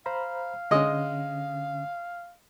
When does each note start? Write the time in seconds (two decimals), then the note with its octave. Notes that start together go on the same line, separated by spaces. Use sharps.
0.06 C5 F5 A#5 B5
0.71 D3 G#3 C#4 D#5